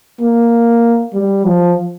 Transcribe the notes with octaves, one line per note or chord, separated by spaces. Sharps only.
A#3
G3
F3